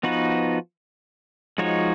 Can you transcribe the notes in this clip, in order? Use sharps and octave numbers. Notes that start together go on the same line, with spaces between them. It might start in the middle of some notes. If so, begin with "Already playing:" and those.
F3 B3 D#4 F#4 B4
F3 G#3 D#4 F#4 C#5